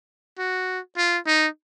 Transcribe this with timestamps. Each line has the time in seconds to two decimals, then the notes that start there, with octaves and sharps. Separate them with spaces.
0.38 F#4
0.97 F4
1.27 D#4